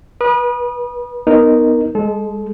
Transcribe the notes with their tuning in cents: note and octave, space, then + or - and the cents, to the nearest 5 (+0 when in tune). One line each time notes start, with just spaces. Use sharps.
B4 -35 D#6 -25
B3 +0 D#4 -5 A#4 +0
G#3 +0 A4 -30